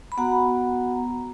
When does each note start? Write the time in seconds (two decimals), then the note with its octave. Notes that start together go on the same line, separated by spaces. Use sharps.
0.12 B5
0.17 B3 F#4 F#5 A#5